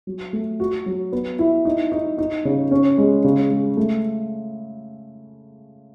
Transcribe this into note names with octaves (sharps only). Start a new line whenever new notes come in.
F#3
A3
F#4
F#3
B3
E4
D#4
D#4
D#4
C#3
C#4
G#3
C#3
G#3
A3